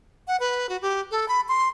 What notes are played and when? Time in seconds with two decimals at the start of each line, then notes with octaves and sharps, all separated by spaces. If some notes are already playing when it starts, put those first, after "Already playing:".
0.27 F#5
0.40 B4
0.69 F#4
0.82 G4
1.11 A4
1.28 B5
1.49 C6